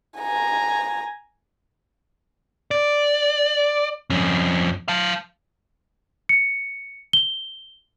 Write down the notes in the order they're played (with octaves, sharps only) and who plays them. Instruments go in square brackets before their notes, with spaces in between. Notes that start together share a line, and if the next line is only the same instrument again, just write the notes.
[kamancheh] G#5 A#5
[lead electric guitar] D5
F2 C#4
F5 A5
[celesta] C#7
G7